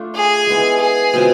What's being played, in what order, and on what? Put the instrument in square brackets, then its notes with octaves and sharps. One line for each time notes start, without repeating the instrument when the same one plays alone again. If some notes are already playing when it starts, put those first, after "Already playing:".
Already playing: [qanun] A3 D4 F4
[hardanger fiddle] G#4
[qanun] G#3 B3 E4
[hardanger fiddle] G#4
[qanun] B2 G#3 C4 F4